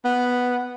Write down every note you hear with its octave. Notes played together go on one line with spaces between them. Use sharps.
B3